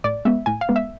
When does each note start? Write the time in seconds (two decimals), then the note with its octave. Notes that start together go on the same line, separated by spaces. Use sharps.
0.04 A2 D5
0.25 G#3 B3 E5
0.46 A2 G#5
0.61 F5
0.69 G#3 B3
0.76 E5